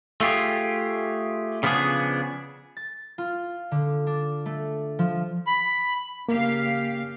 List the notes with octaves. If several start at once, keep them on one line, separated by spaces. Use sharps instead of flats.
A3 F4 G4 G#4
C#3 F3 B3 D4 G#4
A6
F4
D3
D4
A3
F3
B5
C#3 A#3 G4 F5